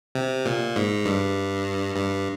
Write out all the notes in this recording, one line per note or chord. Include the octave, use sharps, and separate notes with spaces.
C3
A#2
G#2
G2
G2